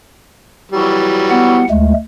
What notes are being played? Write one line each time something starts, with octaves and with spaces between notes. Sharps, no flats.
E3 F#3 G3
B3 F#5
D2 G#3 A3